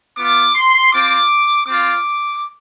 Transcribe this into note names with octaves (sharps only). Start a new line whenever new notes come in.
B3 F4 D6
C6
C4 F4 D6
C4 F4 D6